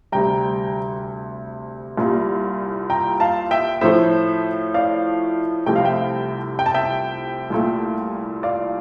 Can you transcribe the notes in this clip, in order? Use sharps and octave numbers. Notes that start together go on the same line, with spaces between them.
D2 C3 G3 G5 A#5
C2 A#2 G3
G5 A#5
F5 A5
E5 G5
A2 F3 A3 C5 E5
D5 F5
C2 C3 F3 A3 G5
F5
E5 G5
G5
A5
E5 G5
C2 A#2 A3
D5 F5